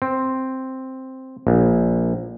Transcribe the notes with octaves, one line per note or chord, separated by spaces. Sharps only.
C4
A#1